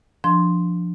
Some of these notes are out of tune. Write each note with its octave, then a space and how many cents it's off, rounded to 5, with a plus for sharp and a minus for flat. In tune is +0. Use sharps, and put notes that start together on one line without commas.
F3 +0 D4 +0 C6 +0